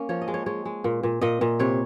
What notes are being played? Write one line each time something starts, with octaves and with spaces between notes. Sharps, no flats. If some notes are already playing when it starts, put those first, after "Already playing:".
Already playing: A#3 C#4
F3 C#5
D#5
G#3
C#5
G#3 C#5
G#3
A#2
A#2
A#2 D#5
A#2
C3 C#5